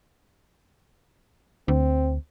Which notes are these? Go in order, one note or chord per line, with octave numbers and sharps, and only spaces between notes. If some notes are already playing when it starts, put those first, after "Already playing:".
D2 C4